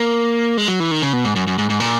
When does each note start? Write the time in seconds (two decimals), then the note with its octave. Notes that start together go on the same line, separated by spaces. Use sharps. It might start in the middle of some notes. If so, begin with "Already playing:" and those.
Already playing: A#3
0.57 G#3
0.68 F#3
0.80 E3
0.91 D#3
1.02 C#3
1.13 B2
1.24 G#2
1.36 F#2
1.47 F#2
1.58 G#2
1.70 G#2
1.80 A#2